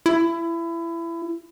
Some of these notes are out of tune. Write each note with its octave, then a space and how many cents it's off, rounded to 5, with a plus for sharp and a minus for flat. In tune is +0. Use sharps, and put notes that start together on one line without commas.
E4 +25